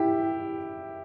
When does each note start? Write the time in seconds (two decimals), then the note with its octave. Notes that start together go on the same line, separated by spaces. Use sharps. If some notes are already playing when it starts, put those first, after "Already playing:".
Already playing: E4 G4